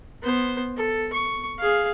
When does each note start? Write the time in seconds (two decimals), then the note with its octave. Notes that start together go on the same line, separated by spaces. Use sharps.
0.22 B3 C5
0.77 A4
1.13 C#6
1.59 G#4 F5